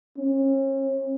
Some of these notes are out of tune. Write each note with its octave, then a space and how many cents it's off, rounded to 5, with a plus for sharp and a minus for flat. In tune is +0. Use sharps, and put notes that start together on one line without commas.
C#4 -40